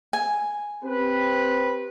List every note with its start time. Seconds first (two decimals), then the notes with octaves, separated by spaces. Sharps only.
0.13 G#5
0.84 C4 G4 B4